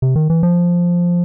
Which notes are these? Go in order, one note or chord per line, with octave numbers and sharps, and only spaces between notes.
C3
D#3
E3
F3